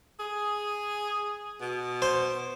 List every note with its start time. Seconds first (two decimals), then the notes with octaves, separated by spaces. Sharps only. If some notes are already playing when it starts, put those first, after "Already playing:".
0.20 G#4
1.61 B2
2.02 C5